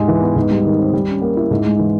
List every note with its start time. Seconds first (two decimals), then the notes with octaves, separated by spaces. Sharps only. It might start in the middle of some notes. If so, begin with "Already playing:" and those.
Already playing: G#2 G#3 G4
0.08 E3
0.21 B3
0.36 G#2
0.51 G3
0.65 D#3
0.79 C4
0.93 G3
1.08 C#4
1.22 A#3
1.36 E4
1.51 G#2
1.66 G#3
1.79 E3